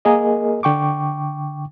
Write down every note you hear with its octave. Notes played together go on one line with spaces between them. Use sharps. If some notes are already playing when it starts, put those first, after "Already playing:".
A#3 G#4 A#4 D#5
D3 G5 C#6 D6